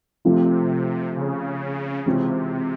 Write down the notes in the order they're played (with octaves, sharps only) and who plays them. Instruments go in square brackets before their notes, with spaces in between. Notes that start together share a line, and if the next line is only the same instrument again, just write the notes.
[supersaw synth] C3 [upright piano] F3 A3 C4 F4
[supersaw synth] C#3
[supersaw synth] C3 [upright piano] E3 G#3 C4 F4